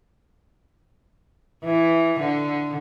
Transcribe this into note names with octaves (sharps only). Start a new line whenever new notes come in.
E3
D3